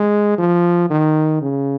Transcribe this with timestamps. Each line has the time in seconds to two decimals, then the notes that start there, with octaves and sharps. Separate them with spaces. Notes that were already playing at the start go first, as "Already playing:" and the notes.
Already playing: G#3
0.38 F3
0.90 D#3
1.42 C#3